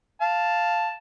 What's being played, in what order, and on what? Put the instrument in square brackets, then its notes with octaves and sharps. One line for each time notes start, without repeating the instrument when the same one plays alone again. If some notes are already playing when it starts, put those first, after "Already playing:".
[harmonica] F5 A5